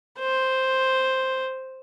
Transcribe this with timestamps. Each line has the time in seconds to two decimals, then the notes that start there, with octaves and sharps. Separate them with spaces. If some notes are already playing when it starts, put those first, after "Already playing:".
0.20 C5